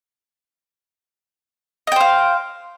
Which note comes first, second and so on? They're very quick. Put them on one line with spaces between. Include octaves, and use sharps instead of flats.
D#5 G5 C5 F5